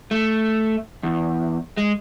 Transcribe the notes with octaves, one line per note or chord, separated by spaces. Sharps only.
A3
E2
G#3